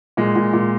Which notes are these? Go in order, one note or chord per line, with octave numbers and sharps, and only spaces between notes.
A#2 G#3
A#2
A#2